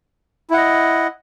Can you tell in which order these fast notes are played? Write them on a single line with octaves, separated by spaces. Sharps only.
E4 F#5 D#5